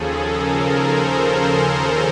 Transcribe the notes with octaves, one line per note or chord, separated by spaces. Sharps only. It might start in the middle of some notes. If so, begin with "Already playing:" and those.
Already playing: D#2 C#3 F3 G#4 A4
A#4
C5